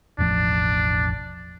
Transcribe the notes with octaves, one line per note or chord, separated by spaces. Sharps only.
E1 A1 F3 D4